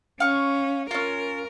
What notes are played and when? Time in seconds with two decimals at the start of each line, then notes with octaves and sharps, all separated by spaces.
0.20 C#4 F5 C#6
0.91 C#4 F4 A#4